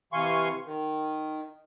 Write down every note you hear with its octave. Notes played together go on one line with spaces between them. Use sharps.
C3 E3 F5 G#5 C6 C#6
D#3